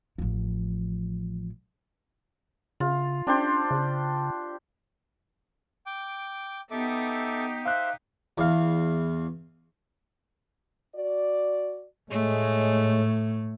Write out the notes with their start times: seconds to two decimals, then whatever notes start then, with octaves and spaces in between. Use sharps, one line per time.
0.18 A1 F3
2.80 C#3 F4
3.27 C#4 D4 G4 C5
3.71 C#3
5.86 G5 D6
6.71 B3 D#4 G4 A4 E5 D6
7.66 C5 E5 F5 F#6
8.38 E2 F5
10.96 F#4 D5
12.11 A2 G#3 A3 C#5